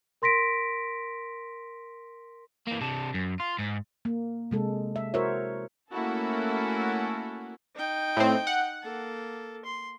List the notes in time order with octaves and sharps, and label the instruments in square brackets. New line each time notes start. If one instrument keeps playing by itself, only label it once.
[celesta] A#4 C6 A#6 B6 D7
[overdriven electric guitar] E3 A#3
C3 D4
F#2
F4
G#2
[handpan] A#3
C3 G#3 A4
E5
E4 F#4 A#4 C5 C#5 E5
[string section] A3 A#3 C#4 E4 F#4 A4
[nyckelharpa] D#4 G5
[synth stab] A2 C4
F#5
[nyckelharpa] A#3 A4
C6